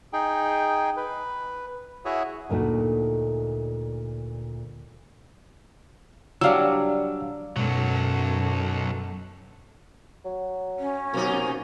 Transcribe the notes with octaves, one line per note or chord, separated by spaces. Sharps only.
D#4 G#4 G5
B4
E4 F#4 G#4 C#5 E5 D#6
D2 A#2 A3 D#4 F#4
F#3 G3 D4 F5 E6
B1 F#2 B2 F#3 G#3 A4
F#3
C#4
B2 F#3 A#3 D#4